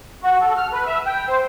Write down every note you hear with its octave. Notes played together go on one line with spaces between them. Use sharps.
F#4
A4
F6
B4
E5
G5
C5